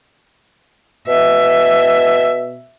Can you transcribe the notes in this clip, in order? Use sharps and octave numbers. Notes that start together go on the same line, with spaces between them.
B2 E5